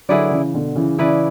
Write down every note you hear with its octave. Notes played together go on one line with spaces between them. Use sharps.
D3 F#3 E4 G#4 B4 D5
C#3 E3
B2 D3
C#3 E3
C#3 E3 E4 G#4 B4 D5